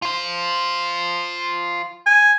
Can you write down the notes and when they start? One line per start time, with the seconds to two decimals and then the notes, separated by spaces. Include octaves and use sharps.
0.02 F4 C5
2.06 G#5